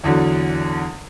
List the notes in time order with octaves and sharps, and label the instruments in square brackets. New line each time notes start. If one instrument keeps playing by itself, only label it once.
[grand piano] E2 D3 F#3